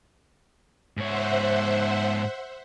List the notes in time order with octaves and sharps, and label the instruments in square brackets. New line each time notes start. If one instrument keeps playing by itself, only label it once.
[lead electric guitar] G#2 C#5 [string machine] C5 E5 F#5